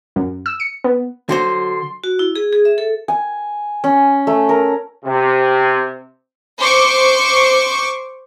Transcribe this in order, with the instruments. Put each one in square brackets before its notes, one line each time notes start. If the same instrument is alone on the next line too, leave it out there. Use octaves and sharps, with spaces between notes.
[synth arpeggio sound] F#2
E6
C#7
B3
[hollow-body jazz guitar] D3 F#4 C5 [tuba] F#3 [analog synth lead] C6
[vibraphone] F#4
E4
G#4
G#4
E5
A4
[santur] G#5
C#4
A3
A#4
[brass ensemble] C3
[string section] C5 C#6 D6